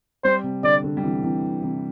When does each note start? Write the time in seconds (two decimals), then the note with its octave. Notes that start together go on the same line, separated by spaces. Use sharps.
0.24 G3 C4 C5
0.44 C3
0.64 D3 D5
0.84 D3
0.97 G3
1.03 C3 E3
1.24 C3 E3
1.63 C3 E3